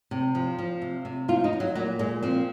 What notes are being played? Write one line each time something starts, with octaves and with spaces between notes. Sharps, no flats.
C3
F3
F3
C3
C3
F3 F4
D#4
F3
F#3
A#2 F#3
A#2 G#3
F3 C4